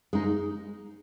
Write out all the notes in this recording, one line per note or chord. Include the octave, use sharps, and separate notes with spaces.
G#3 D#4